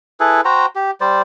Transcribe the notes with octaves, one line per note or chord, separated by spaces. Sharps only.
E4 G#4 A4 B4
F#4 C5 G5 A#5
G4
G3 C5 D5